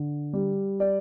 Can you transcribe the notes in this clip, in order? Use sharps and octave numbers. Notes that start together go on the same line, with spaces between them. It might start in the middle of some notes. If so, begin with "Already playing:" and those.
Already playing: D3
G3
D5